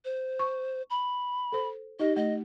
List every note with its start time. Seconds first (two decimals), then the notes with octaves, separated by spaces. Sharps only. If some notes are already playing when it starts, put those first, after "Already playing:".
0.05 C5
0.39 C#6
0.90 B5
1.52 A4 C5
1.99 D#4 G4 D#5
2.16 A3 D#5